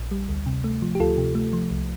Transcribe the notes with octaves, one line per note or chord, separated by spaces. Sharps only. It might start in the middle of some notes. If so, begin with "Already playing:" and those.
Already playing: A#1
G3
D2
C3
A3
F3
G4
D2 F4 A4
C3
A3
F3
C2